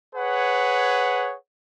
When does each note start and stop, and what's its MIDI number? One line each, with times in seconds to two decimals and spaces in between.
0.16 1.36 68
0.16 1.36 71
0.16 1.36 73
0.16 1.36 78